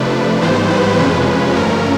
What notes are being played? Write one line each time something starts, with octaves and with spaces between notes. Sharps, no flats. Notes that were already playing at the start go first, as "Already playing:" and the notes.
Already playing: C3 F3 A3 D4 B4
G#2 E3 G3 B3 C5
B4
F2 C3 F3 G#3 C#4 B4
G2 D3 F3 A3 C#4 A#4